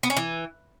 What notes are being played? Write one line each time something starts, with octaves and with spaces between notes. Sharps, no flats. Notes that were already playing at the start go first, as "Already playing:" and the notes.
B3
C#4
E3